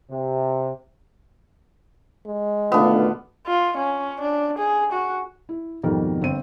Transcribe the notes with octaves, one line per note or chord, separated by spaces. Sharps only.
C3
G#3
A#1 B2 D3 D#3 A3 B3 D4 F4
F4
C#4
D4
G#4
F#4
E4
G#1 F2 B2 D#3 G3 A#4
G1 C4 D#7